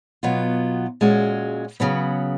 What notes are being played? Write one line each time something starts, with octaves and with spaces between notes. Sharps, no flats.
B2 F#3 B3 F4
A#2 G#3 C#4 F#4
C#3 F#3 B3